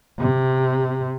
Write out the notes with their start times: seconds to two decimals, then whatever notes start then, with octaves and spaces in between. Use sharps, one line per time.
0.19 C3